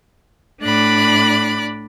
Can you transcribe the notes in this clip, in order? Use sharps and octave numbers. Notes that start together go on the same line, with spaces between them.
A2 D4 D5 B5 F#6